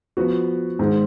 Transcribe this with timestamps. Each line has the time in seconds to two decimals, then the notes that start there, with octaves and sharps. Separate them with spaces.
0.17 F3 B3 F#4
0.79 G#2 D#3 G#3